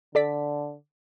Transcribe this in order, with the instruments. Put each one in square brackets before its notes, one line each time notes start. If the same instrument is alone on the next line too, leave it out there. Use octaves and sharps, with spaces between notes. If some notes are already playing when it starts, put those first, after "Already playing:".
[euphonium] D3 [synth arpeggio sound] A4 D5 B6